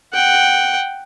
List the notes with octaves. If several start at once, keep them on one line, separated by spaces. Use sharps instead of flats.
F#5 G5